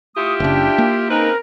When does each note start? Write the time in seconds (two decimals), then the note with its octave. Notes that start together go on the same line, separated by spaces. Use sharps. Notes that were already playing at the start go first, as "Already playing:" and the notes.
0.16 A3 E4 F4 G4 C#6 D#6
0.40 F#1 C#3 D4 E5 G5
0.78 A#3
1.10 C#3 C4 D#4 A#4 B4